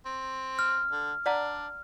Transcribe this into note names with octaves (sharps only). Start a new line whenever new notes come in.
C4
F6
D3
D4 D5 F#5 A#5